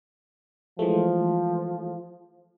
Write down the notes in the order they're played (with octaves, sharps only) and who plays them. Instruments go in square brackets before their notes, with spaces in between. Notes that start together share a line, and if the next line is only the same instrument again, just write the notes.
[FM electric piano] E3 G#3 A3 [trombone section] F3